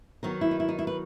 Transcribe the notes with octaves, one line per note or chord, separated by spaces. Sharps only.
D#3 F#3 B3 A#4
E4
D#4
E4
D#4
E4
B4